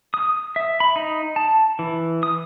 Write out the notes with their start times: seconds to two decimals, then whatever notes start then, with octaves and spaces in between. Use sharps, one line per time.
0.14 D#6
0.56 E5
0.80 B5
0.96 D#4
1.36 A5
1.79 E3
2.23 D#6